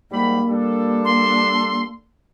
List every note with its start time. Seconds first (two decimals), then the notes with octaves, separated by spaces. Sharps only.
0.11 G#2 G3 A#3 B5
0.49 G3 D4 A4
1.05 C6